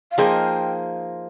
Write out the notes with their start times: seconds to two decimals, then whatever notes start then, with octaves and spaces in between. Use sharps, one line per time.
0.12 F5
0.18 F3 A#3 D#4 G#4 C5 G5